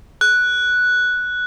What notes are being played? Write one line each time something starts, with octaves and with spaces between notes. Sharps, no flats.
F#6